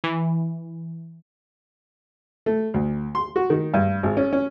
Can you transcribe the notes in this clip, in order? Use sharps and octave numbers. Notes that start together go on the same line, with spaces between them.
E3
A3
D2
C6
F#4
D#3
G2
G#1
C#4
C#4